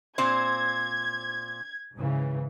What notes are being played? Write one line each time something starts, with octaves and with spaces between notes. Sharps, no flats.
A#2 C4 C5 G#6
G#2 C#3 E3